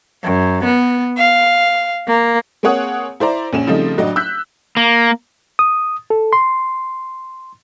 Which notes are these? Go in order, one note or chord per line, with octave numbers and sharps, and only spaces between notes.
F#2
B3
F5
A#3
A#3 C4 G#4 C#5 F#5 D#6
E4 C5 D5 A#5
A#1 C#4 E7
C#3 F3 G3 A3 C4 D#4
A1 F#3 D4 D#5
E6 F#6 G6 B6
A#3
D#6
A4
C6